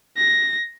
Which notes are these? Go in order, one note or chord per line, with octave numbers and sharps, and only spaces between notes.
A#6